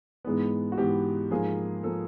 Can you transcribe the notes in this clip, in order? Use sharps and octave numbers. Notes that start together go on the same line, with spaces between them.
G#2 E3 G#3 B3
F#4
G#2 E3 G#3 B3 G4
G#2 F3 A#3 G#4
F3 A#3 A4